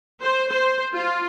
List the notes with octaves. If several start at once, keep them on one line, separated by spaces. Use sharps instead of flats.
C5
C5
F4